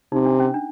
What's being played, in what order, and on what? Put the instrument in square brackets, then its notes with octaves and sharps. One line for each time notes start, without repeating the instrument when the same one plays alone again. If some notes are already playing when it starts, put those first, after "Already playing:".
[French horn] C3 [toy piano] D#4
[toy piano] D4
C#4
D4